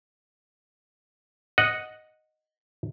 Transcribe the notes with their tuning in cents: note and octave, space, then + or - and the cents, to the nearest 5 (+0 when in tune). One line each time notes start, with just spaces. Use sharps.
D#5 +0 F#5 -5